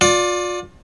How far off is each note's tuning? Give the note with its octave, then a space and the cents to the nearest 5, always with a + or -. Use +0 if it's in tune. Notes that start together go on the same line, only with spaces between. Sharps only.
F4 +35 D5 +0